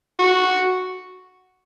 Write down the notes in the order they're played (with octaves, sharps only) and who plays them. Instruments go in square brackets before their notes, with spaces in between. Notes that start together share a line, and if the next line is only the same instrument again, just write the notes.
[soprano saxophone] F#4